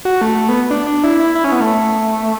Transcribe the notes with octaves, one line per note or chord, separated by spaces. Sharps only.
F#4
A3
A3
B3
D4
D4
E4
E4
E4
C#4
B3
A3